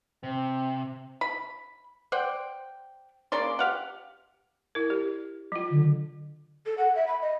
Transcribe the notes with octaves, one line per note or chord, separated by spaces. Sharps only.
C3 C4
B5
C5 D5 F#5 G5
C#3 A#3 D5 C6
G4 F5 F#5
E4 A#4
G4
F#3 F4
D3
A4
F#5
E5
B5
D#5